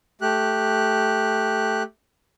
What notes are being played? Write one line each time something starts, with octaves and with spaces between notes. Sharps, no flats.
A3 G4 F#6